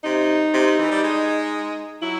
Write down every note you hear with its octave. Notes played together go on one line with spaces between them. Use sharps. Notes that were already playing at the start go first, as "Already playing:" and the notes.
C3 D#4
C3
C3
E3
G3
G#3
F#3 E4